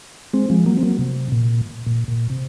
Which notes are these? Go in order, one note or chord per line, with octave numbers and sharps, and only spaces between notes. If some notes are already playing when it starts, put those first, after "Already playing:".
G#3 C4
F3 G#3
F#3 A#3
C4
F#3 A#3
C3
A#2
A#2
A#2
C3